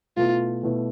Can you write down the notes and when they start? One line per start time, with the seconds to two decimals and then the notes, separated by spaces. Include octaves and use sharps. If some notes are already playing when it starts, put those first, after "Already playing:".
0.17 B2 A3 E4 F4 B4
0.63 B2 A3 E4 B4